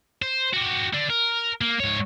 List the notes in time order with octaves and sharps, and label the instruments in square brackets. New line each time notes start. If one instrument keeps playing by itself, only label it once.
[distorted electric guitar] C5
F#4 G4
D3 D4
A#4
A#3
G#2 C#5